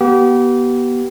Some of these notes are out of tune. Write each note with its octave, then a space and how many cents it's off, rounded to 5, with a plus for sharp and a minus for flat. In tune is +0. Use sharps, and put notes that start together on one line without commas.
B3 -30 G4 -30